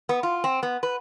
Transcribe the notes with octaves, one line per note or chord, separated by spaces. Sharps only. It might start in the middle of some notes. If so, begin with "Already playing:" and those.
B3
F4
C4
B3
B4